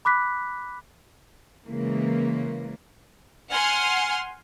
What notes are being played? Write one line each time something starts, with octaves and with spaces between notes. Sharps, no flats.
B5 D6 F#6 B6
C#3 E3 G#3 A#3
F#5 G#5 C6 F6